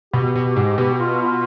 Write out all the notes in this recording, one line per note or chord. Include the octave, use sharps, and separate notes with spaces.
B2 G4
B2
G4
G#2
B2 G4
G4
F4
F4